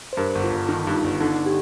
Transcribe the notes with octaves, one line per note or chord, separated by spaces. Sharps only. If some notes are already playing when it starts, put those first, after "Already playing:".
C5
G2 A#4
G1
F4
G1
D#3 D#4
G2
F4
G1
D3 D#4
G4